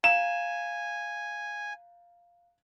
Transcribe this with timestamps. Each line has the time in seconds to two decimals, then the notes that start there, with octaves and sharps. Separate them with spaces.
0.04 F5 G#5 A#5 E7